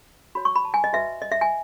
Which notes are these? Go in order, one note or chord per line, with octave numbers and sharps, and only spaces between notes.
F#4 C#5 B5
C#6
B5
A5
G#5
D#5
F#4 B4 E5
D#5
E5
G#5